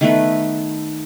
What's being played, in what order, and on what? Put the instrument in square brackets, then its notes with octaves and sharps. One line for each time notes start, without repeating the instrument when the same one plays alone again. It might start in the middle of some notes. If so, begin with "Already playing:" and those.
[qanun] D#3 A3 B3 B4